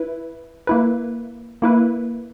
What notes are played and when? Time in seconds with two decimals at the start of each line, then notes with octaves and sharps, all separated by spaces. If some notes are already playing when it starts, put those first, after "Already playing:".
Already playing: E4 B4
0.67 A#3 E4 B4
1.62 A#3 E4 B4